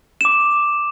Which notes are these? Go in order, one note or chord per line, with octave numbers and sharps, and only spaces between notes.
D6 E7